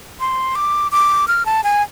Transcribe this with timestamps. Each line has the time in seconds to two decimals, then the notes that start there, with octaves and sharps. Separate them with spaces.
0.20 C6
0.55 D6
0.92 D6
1.28 F6
1.46 A5
1.64 G#5